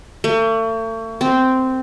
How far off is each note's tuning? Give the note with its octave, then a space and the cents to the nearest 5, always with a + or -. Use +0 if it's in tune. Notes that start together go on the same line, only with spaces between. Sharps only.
A3 +40
C4 -10